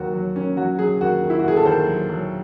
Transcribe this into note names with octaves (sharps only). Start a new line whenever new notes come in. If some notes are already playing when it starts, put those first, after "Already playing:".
Already playing: D#2 F#3 F#4
F#3
D#2 C#4
F#3 F#4
F#3 G#4
D#2 F#4
D#3
E4
F#4
D#2 G#4
A4
D#2 C5
F#3
F#3